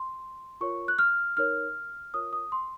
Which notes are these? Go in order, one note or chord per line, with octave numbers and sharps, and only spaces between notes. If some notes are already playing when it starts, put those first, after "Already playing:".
Already playing: C6
F4 A#4 C#5 C#6
F#6
F6
D#4 A#4 C#5 F6
F4 A#4 C#5 D#6
D#6
C6